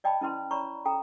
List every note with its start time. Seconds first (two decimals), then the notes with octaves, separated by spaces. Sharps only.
0.04 D5 D#5 G5 A5 B5
0.21 C#4 E4 B4 C6
0.51 C#5 D5 A#5 B5 C#6
0.85 C#4 A4 G5 A#5